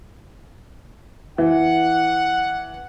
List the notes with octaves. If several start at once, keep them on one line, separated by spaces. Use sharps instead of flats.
E3 F#5